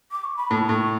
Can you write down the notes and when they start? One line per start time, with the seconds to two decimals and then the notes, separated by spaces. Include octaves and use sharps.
0.12 D6
0.24 C#6
0.37 B5
0.51 A2 A5
0.69 A2 C#6